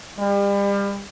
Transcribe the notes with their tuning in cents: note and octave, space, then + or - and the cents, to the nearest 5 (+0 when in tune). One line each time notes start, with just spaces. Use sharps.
G3 +35